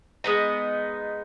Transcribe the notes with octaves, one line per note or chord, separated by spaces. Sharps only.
G#3 B3 D#4